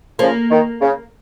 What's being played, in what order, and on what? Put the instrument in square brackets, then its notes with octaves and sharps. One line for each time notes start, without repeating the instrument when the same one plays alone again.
[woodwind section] C#3 F3 [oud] A#3
[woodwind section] D#3
C#3